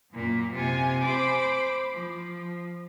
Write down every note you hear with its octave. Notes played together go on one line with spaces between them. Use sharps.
F#2 A#2 A#3
C3 F4 G#5
C5 B5 D6
F3